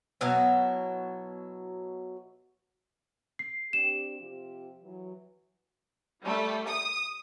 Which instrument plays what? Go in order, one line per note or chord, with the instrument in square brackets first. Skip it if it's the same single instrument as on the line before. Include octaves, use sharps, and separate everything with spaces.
[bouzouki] B2 F#3 E4
[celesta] C7
[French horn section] C4 D4 G4 [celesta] E7
[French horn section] C3 F3 G4
E3 F#3
[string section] G3 A3
D#6